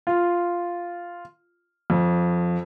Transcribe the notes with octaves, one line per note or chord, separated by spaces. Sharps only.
F4
F2